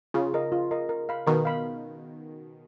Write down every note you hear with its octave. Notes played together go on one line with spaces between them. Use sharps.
C#3 F4
A#4 D#5
F4
A#4 D#5
A#4
F5 B5
B2 D#3 A#4
F5 B5